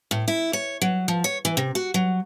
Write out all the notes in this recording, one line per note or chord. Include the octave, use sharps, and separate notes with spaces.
A2
E4
C#5
F#3
F3
C#5
E3
C3
F#4
F#3